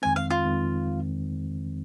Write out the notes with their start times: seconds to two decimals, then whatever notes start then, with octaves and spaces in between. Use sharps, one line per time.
0.02 F2 D#3 G#3 C4 G#5
0.16 F5
0.30 F4
0.45 F2 D#3 G#3 C4